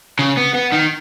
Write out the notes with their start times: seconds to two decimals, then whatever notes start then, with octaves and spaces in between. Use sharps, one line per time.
0.19 C#3
0.37 B3
0.54 B3
0.72 D#3